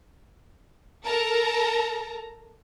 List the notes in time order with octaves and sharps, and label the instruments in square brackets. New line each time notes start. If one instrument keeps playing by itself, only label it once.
[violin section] A4 A#4 A5 A#5